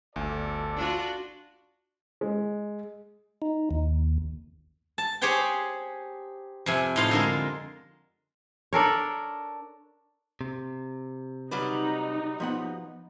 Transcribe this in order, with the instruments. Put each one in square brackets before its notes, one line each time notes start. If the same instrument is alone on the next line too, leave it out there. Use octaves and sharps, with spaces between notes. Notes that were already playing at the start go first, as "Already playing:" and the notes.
[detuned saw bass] G1 [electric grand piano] D2 [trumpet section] A4 D5
[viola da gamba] D4 F4 F#4
[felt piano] G#3
[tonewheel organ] D#4
D#2
[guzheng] A5
G4 G#4 C5 C#5 F#5 G5
F2 C3 G#5
A2 D#4 F4 F5
D3 G#3 A#4
[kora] D4 A4 A#4 C#5
[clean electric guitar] C3
[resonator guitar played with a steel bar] F#3 G3 B4 [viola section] D#4
[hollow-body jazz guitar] F3 B3 F#5